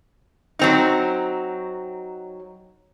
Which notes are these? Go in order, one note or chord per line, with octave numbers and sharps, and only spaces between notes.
F#3 C4 D#4